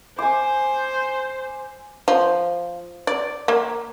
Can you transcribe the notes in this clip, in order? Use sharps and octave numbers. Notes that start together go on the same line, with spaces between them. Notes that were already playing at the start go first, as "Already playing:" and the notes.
C5 G#5 D6
F3
D5
A#3